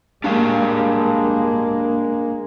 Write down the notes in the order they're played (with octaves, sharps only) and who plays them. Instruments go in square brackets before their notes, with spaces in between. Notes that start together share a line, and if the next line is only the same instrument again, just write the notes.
[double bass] G#3 A#3 [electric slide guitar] D4 G4 F5